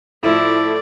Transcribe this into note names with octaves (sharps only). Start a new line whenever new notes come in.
A2 F3 A3 E4 D5